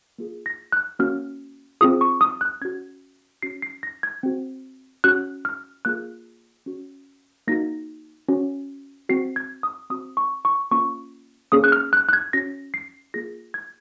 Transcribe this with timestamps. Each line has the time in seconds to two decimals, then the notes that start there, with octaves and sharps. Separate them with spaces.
0.18 A#3 F4 G#4
0.46 A#6
0.72 F#6
0.99 A#3 C#4 F#4 F6
1.81 C4 F4 G#4 D#6
2.01 C#6
2.21 D#6
2.41 F#6
2.61 C#4 F#4 G#6
3.42 C#4 F#4 C7
3.62 C7
3.83 A#6
4.03 G#6
4.23 C4 F#4
5.04 C#4 F#4 F#6
5.45 F6
5.85 A#3 F4 G#4 F#6
6.66 C#4 F#4
7.47 A#3 D#4 F#4 A#6
8.29 C#4 F#4
9.09 C4 F#4 C7
9.36 G#6
9.63 D#6
9.90 C4 F#4 D#6
10.17 C#6
10.45 C#6
10.71 A#3 C#4 F4 C#6
11.52 A#3 C#4 G#4 D#6
11.64 F#6
11.72 F6
11.93 F#6
12.09 F#6
12.13 G#6
12.33 C#4 F#4 A#6
12.74 C7
13.14 A#3 F4 G#4 A#6
13.54 G#6